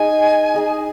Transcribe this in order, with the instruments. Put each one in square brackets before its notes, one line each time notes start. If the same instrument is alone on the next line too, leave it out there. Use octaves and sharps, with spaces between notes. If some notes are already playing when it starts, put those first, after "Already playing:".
Already playing: [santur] D#4 G#4 D#5 [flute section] G#5
[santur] D#4 G#4 D#5